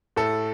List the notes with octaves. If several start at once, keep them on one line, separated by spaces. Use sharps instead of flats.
A2 A4